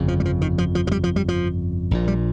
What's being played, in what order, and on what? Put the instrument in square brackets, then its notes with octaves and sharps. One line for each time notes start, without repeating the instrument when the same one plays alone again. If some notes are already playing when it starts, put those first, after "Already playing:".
Already playing: [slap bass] G1 F2 C#3
F3
G3
F3
D#3
F3
F3
F3
G3
F3
G3
F3
A#1 A#2
G3